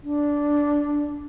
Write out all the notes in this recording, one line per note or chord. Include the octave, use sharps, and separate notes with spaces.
D4